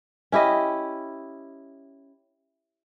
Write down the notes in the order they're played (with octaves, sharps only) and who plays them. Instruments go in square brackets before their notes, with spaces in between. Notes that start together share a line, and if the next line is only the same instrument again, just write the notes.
[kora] C#4 E4 G4 D#5